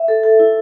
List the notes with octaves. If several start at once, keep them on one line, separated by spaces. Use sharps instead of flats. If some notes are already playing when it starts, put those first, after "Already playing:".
Already playing: E5
A4
A4
E4